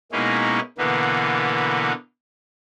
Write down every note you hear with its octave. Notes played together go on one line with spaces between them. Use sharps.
B2 G#3 A#3 C#4 D#4 E4
B2 D3 E3 A#3 B3